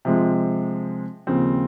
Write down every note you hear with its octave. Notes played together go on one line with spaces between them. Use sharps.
C3 F3 G#3
D#2 C#3 F3 C4